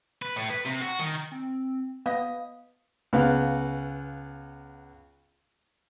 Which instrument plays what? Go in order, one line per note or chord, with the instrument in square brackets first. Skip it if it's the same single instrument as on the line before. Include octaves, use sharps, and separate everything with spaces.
[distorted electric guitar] B4
A2
B4
C3
F#4
D#3
[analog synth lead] C4
[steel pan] B3 D#5 [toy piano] F5 [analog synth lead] D#6
[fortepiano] C#2 B3 F5